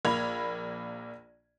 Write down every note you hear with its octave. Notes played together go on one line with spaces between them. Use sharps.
A#1 A#3 B5 G#6 F7